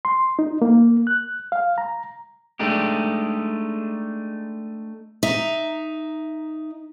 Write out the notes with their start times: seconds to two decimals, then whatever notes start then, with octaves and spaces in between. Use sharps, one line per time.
0.05 C6
0.39 D#4
0.62 A#3
1.07 F#6
1.52 F5
1.78 A#5
2.59 G#3 A3 D4 D#4 G4
5.23 D#4 E5